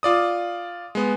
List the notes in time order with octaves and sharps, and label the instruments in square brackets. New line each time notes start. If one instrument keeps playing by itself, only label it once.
[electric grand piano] F4 D5 D#6
G#3 B3